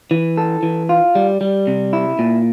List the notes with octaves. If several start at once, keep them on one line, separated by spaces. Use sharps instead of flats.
E3
A4
E3
F4
G3
G3
C3
E4
A#2